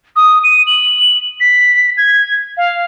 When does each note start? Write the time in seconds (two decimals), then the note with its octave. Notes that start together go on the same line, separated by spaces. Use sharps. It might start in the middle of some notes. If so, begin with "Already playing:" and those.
0.16 D#6
0.44 D#7
0.67 F#7
1.40 B6
1.97 G#6
2.57 F5